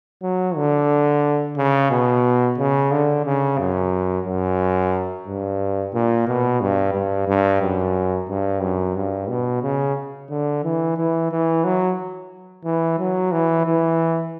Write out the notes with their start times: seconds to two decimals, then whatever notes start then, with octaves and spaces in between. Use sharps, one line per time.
0.23 F#3
0.56 D3
1.57 C#3
1.91 B2
2.58 C#3
2.92 D3
3.26 C#3
3.59 F#2
4.25 F#2
5.27 G2
5.94 A#2
6.28 B2
6.61 G2
6.94 G2
7.28 G2
7.62 F#2
8.29 G2
8.62 F#2
8.96 G2
9.29 B2
9.63 C#3
10.30 D3
10.64 E3
10.97 E3
11.32 E3
11.64 F#3
12.65 E3
12.99 F#3
13.32 E3
13.66 E3